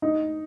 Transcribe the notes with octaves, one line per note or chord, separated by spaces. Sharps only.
D#4